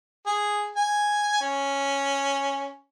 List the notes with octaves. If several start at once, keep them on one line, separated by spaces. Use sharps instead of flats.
G#4
G#5
C#4